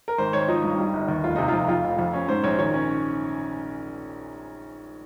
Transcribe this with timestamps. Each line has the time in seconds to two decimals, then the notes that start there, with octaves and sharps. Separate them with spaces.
0.08 A#4
0.18 G#1 C5
0.33 G#1 C#5
0.48 F3 D#4
0.63 G2
0.78 G3
0.93 G1
1.08 D#2
1.24 F1 F4
1.36 C3 D#4
1.48 F4
1.54 F2
1.68 F2 F4
1.84 F1
1.99 F2
2.13 C#4
2.28 G#2 C5
2.44 A#1 C#5
2.59 D#3 C#5
2.74 C#4